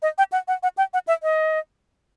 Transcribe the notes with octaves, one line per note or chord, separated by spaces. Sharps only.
D#5
G5
F#5
F#5
F#5
G5
F#5
E5
D#5